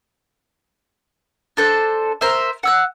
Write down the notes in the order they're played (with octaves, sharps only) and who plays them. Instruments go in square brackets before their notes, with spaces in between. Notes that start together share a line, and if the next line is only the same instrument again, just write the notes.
[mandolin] D4 A4 C5
A#4 C5 E5
F#5 E6 F#6